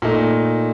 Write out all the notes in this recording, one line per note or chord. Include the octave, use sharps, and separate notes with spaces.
A#2 A3 D#4